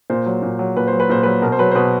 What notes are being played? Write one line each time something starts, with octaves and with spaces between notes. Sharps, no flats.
A#2 C5
F#3
A#2
F#3
A#2 B4
C5
F#3
B4
A#2 C5
F#3 B4
B2 A#4
C5
F#3 B4
C5
B2 B4